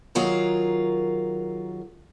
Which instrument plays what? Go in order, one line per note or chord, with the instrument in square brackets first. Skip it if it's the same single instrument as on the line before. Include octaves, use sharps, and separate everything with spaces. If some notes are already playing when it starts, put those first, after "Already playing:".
[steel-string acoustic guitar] D#3 F#3 F4 G#4 A#4